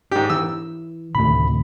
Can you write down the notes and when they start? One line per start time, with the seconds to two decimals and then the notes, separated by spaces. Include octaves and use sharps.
0.12 G#2 D4 G4
0.30 E3 E6
1.15 D2 A2 C3 D#3 B5